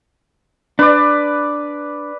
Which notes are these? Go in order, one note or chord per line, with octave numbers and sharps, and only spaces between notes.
D4 B4 D5